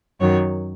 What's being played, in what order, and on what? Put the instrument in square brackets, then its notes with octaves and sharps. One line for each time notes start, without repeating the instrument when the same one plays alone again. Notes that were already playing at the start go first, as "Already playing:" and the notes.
[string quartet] F#2 D#3 F#3 C#5